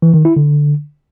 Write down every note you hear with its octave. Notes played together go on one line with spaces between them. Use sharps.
E3
D#3
E4
D3